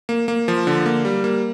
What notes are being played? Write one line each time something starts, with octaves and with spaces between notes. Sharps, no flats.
A#3
A#3
F3
D3
A#3
G3
A#3